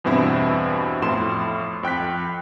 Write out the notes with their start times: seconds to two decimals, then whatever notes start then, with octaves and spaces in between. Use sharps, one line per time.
0.04 E2 G2 B2 C4 E4
1.02 F2 A2 C6 E7
1.83 F2 G5 F#6 B6